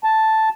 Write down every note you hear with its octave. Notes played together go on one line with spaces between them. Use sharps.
A5